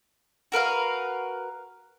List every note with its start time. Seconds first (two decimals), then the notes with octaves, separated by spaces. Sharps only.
0.52 F#4 A#4 B4 F5